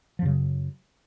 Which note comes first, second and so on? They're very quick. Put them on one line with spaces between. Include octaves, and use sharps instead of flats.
F3 F#2 C#3 F#3